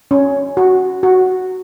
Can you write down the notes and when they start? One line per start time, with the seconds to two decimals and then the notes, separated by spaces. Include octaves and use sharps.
0.11 C#4
0.57 F#4
1.03 F#4